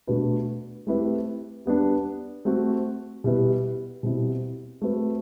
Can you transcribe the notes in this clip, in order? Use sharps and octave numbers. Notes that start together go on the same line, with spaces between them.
B2 A3 D4 F#4 B4
A3 C4 E4 G4 B4
G3 B3 D4
A3 C4 F#4
B2 G3 B3 E4 B4
B2 G3 C4 E4
A3 C4 F#4 B4